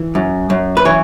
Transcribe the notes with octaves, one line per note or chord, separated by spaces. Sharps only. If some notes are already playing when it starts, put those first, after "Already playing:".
Already playing: E3
F#2
F#2
B4
E3 C#5